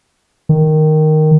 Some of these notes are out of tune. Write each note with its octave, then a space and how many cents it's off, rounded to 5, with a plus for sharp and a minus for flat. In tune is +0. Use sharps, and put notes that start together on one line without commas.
D#3 -5